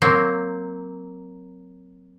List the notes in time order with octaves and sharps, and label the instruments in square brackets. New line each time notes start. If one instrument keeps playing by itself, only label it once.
[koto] F#3 A#3 C4